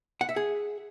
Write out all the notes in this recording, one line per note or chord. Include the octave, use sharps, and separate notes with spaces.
F#5
E5
G#4